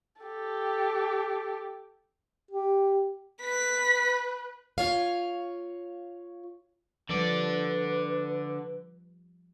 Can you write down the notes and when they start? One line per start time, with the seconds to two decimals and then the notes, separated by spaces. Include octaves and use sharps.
0.22 G4 A4
2.51 G4
3.42 B4 B6
4.78 F4 C#5 F5
7.09 D3 F3 G3 B4 D5